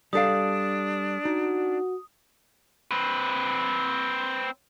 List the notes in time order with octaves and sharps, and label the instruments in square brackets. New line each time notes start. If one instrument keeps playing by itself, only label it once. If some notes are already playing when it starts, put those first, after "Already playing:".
[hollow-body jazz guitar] G3 A4 F5 [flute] D4 [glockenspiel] D#6
[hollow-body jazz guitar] D#4 [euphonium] F#4
[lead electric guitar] C4 B4